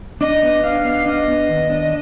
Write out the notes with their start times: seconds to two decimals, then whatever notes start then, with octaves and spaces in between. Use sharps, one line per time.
0.21 D4 D#5
0.43 B3
0.64 D4 F5
0.85 B3
1.06 D4 D#5
1.28 B3
1.49 D#2
1.70 D4